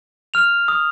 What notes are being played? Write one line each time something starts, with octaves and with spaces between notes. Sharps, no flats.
F6 F7
D#6